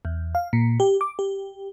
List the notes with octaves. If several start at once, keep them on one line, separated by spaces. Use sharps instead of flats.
E2
F5
A#2
G4
D6
G4